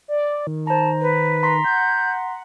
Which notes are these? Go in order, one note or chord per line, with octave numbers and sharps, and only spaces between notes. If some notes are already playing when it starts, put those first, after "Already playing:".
D5
D#3
C5 A5 A#5
B4
A#5 C6 B6
F#5 G6